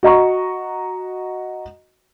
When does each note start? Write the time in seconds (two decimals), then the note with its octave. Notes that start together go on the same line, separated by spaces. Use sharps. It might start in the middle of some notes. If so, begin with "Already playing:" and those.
0.03 F#4 D#5 A#5 C#6